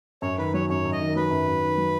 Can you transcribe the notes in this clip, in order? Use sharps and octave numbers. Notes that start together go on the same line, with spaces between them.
F#2 C#5
D#3 B4
F#3 C#5
F#2 C#5
F#2
D#5
D#3
F#3 B4
F#2
F#2
D#3
F#3